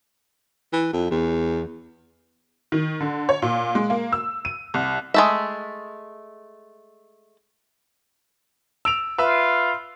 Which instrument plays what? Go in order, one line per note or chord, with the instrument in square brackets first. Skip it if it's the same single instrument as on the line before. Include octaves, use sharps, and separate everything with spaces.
[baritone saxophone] E3
F2
E2
[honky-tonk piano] D#3
D3
C#5
A#2
G#3
A#3
E6
D#7
C2
[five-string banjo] G#3 A3 E5
[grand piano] E6 D7 F7
[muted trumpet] F4 [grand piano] B4 E5